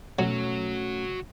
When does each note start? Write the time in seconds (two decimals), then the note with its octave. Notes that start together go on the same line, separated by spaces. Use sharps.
0.19 B2 F#3 A3 C#4 F#4 C#5